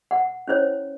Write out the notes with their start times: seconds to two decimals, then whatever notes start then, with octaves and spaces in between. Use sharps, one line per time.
0.11 F#5
0.48 C#4 E4 C5 C#5